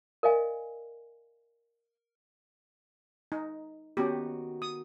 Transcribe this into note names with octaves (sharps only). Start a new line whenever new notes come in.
A#4 D5 D#5 F5 G#5
D#4
D#3 B3 C#4 F#4 G4
D#6